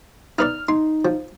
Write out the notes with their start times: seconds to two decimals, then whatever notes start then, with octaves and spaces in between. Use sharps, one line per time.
0.39 D#4 B4 D5 F6
0.69 D#4 C6
1.05 F3